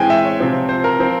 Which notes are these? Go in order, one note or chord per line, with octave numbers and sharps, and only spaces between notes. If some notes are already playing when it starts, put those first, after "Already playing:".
Already playing: E3 G#3 C4 G5 G#5
E5
C#5
C3 F3 C4
C5
A#4
F3 C4